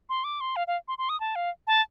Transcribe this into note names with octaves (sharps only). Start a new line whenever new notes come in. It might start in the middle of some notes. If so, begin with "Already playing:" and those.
C6
D6
C6
F5
F5
C6
C6
D#6
A5
F5
A5